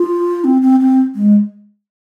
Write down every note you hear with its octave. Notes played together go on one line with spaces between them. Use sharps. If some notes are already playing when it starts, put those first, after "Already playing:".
Already playing: F4
C4
C4
C4
G#3